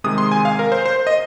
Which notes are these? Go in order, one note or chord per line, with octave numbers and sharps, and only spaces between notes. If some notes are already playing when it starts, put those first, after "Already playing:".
C3 D#3 G#3 D#6
C6
G#5
F5
A#4
C5
C5
D#5